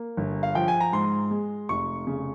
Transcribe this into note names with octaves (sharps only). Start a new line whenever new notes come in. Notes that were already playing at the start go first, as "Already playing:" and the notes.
Already playing: A#3
G1
F5
F3 G5
G#5
A#5
G#2 C6
G#3
F1 C#6
C#3